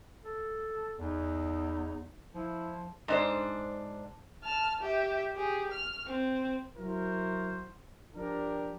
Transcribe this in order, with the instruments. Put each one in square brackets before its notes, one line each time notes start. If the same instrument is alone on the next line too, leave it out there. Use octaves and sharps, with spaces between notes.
[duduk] A4
[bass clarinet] E2 [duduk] D#4
[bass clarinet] F3 [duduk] E4
[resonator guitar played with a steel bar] G#2 D4 C5
[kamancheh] A5 F6
G4 E5
G4 G#4
F6
C4
[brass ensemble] F#3 E4 F#4 A#4 C5
F3 D4 G4 A#4